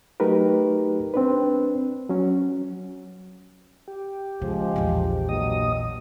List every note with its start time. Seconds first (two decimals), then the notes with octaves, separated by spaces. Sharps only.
0.20 F#3 A3 D#4 G4 A#4 B4
1.14 C4 D4 B4
2.09 F#3 C#4
3.88 G4
4.42 C#3 F3 G#3
4.76 A#1 E2
5.29 G2 A#2 F#3 D#5 D#6